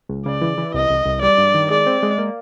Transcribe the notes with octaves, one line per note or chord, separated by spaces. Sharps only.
C#2
C#3 D5
E3
E3
C2 D#5
C2
C2
G3 D5
G2
D#3
G#3 D5
C4
G#3
A#3